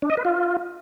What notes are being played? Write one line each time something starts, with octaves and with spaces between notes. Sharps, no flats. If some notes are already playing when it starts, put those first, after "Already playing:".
D4
D#5
B4
F4